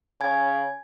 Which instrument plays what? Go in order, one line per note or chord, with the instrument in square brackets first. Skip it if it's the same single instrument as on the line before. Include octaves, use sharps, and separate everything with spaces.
[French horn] C#3 [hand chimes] G#5 G#6